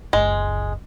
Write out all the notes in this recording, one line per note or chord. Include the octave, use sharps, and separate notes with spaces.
F#1 C#2 G#3